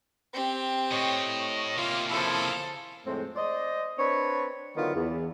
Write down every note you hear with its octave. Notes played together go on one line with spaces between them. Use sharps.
C4 G4
A2 C#5 D#5
C3 A#3 F4
C#3 F3 E4 A4 C5
F2 A2 G#3 C4
C5 D5 D#5
C4 D4 B4 C#5
D3 D#3 F#3 B3 F4
E2